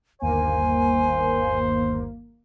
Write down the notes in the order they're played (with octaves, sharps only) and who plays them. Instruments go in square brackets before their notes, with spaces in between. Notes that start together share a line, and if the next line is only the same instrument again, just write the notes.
[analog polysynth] G1 D#2 A#3 [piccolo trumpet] C5 [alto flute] G#5